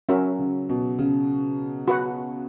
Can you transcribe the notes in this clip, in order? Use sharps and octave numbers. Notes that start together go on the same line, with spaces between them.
F#3 C#4 F#4 A#4 E5
C#3
B2
C#3
F#4 B4 F#5